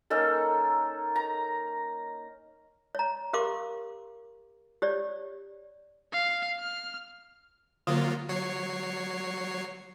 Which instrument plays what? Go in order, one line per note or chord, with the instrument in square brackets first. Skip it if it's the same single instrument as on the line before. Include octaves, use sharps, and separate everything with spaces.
[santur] A#3 C#4 D#4 A4
A#5
[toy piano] C#5 A#5
G4 A#4 F5 C6 D6
G4 C#5 D5
[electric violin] F5
F6
[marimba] D3 [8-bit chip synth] F#3 A#3 F4
[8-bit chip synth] F#3 C#5 C7